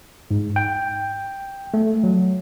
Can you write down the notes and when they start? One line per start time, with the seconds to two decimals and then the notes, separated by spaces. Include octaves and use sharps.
0.31 G#2
0.56 G5
1.74 A3
2.04 F#3